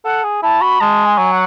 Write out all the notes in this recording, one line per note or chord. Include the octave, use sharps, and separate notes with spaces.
A4 F#5
G#4
E4 A5
F#4 B5
G#3 A5
G#5
F#3
F#5